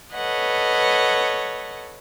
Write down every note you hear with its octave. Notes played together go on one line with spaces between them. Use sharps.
A4 B4 C#5 D#5 F#5